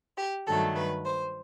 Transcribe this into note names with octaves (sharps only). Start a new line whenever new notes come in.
G4
G2 D#3 F#3 A3 A4
B4
C5